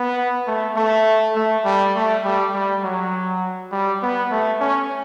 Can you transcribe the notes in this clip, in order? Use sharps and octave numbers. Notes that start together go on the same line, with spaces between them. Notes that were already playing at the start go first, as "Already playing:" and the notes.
Already playing: B3
A3
A3
A3
G3
A3
G3
G3
F#3
G3
B3
A3
C#4